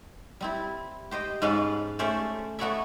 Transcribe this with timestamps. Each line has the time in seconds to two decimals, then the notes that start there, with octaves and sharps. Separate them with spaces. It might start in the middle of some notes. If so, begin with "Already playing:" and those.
0.41 G3 C4 E4
1.11 G4 C5 D#5 G5
1.42 G#2 G#3 C#4 B4 F5 A5
1.99 A3 C#4 C5 D5 E5
2.59 A3 B3 F#4 C#5 D5 E5